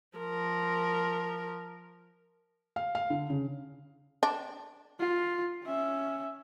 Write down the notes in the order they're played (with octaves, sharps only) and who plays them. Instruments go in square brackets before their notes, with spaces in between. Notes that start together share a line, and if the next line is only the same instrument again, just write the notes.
[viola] F3 A#4
[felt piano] F5
F5
D3
C#3
[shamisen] D4
[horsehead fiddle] F4
C#4 E5